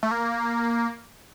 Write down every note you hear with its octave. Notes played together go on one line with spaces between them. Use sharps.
A3
A#3